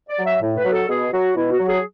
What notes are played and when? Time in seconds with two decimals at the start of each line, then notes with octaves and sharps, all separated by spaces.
0.09 D5
0.17 F#3
0.25 E5
0.40 A2
0.57 B4
0.65 F#3
0.72 A4
0.88 B2 G#4
1.12 F#3 F#4
1.35 B2 E4
1.51 F#4
1.59 F#3
1.67 G#4